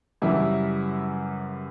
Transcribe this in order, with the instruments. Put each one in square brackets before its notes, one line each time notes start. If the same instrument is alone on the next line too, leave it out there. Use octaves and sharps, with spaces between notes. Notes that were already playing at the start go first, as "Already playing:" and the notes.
[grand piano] F#2 C#3 E3 G3 E4